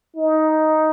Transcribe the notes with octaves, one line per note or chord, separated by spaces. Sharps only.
D#4